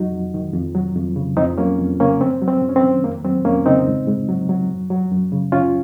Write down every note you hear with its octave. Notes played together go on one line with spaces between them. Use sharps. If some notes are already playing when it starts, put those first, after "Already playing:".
Already playing: F2 F#3 D#4 F#4
F2
D#3
F2
F#3
F2
C#3
F2 C4 D#4
F#3 A#3 C#4
F2
C#3 A#3 C#4
F#2 C4
F#3
C4
F#2
C#4
C4
D#3
F2 A#3
F#3 C4
F2 A#3 C#4
C#3 C4 D#4
G#2
G#2
F#3
F#3
F#2
F#3
F#2
C#3
F#2 C#4 F4